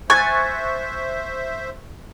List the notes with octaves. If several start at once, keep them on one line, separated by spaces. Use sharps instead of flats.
C5 E5 G#5 C#6 F#6 A6